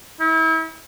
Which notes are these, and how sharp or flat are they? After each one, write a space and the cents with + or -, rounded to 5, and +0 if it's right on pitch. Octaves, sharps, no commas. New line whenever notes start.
E4 -35